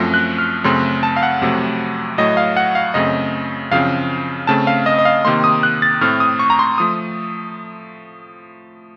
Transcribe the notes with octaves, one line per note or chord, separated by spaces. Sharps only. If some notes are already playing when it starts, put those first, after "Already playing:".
Already playing: F#2 F3 A3 C4 A#6
F#6
F6
F#2 C#3 A3 C4 C6
A5
F5
F#5
F2 C3 F#3 A3
A2 F#3 A3 D#5
F5
F#5
F5
F#2 C#3 A3 C4 D#5
F#2 C#3 F3 C4 F5
C#3 A3 C4 A5
F5
D#5
D#5
F5
C3 D#3 A#3 C6
D#6
F#6
A6
A2 A3 C4 F6
D#6
C#6
A#5
C6
F3 A3 D#6